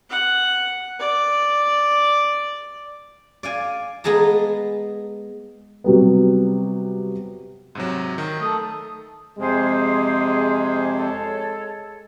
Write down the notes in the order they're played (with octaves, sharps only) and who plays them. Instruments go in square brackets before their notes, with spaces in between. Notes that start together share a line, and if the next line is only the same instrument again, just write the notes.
[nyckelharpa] F#5
D5
[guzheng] D5 F5 G#5
G#3 B3 G#4 A5 A#5
[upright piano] C3 F#3 G3 B3
[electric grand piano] G#2 C3 F#3
D#3
[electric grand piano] A3 [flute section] A4 A#4 D#6
[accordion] F2 C3 [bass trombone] G#3 [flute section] G#4 C5
[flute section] A4 C#5